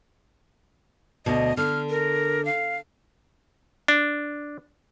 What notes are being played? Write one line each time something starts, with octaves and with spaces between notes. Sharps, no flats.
D2 B2 D#5
D3 F6
A#4
F5
D4